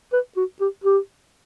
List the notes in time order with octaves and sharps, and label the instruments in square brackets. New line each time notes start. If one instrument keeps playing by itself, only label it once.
[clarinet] B4
F#4
G4
G4